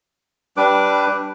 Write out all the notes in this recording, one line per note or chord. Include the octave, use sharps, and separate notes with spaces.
G3 D4 B4 D6